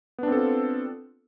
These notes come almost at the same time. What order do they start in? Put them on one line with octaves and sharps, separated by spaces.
B3 D4 C4 A4 F4